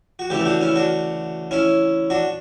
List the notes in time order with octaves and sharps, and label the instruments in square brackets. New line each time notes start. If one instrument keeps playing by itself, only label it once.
[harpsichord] F#4
D2 C#3 E3 E4 G4
D4 F#4
C#4 E4
D4 F#4
C#4 E4
D4 F#4